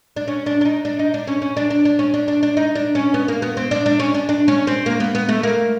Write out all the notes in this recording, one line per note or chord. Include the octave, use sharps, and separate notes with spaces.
D4
C#4
D4
D4
D#4
D4
D#4
D4
C#4
C#4
D4
D4
D4
C#4
D4
D4
D4
D#4
D4
C#4
B3
A#3
B3
C4
D4
D4
C#4
D4
D4
C#4
C4
A#3
B3
B3
A3
A#3